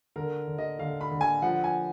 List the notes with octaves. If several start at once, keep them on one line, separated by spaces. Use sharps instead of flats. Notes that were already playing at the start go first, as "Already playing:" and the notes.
D3 A#4
D3
D#5
D3 F5
B5
D3
G#5
F3 F#5
G#5